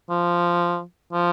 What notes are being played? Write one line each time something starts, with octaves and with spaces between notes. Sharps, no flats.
F3
F3